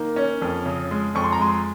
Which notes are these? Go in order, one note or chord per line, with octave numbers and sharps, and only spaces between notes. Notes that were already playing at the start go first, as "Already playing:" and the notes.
Already playing: D#3 A#3
C#4
F2
C#3
G#3
F2 C#6
C6
A#5
G#3 C6